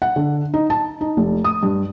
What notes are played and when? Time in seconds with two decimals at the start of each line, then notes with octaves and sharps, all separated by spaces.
0.02 F#5
0.16 D3
0.54 D#4
0.70 A5
1.01 D#4
1.17 F1
1.44 D#6
1.63 G2